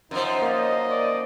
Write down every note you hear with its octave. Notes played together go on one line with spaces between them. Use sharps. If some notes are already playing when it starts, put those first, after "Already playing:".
F#2 F3 D#4
A#3 D#5
D5